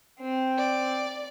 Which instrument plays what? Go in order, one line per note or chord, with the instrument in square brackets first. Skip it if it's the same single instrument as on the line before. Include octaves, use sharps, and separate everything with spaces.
[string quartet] C4
[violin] D5